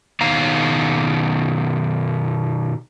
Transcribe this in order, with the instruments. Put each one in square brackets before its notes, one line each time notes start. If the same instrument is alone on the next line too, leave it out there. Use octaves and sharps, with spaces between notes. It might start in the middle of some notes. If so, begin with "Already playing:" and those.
[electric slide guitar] B2 D#3 F5 A#5